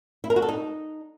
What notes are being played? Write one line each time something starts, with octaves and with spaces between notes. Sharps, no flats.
E4
A#4
F#4
A4
D#4